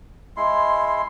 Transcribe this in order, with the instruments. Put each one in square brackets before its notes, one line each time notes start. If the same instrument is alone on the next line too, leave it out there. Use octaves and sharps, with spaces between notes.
[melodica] G#3 E4 C6